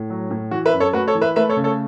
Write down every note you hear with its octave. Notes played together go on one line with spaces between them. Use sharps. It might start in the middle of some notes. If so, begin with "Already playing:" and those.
Already playing: A2
F#3
A2
E3 F#4
B4 E5
F#2
A4 C#5
A3 F#4 B4
A4 C#5
E3
B4 E5
A3 B4 E5
A4 C#5
C#3
A4 C#5